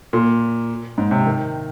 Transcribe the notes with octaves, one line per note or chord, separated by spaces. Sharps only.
A#2
G#2
C3
D#3